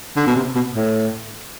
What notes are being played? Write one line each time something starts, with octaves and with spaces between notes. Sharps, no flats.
D3
B2
C3
B2
A2